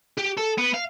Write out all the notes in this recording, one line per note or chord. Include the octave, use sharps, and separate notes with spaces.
G4
A4
B3
F5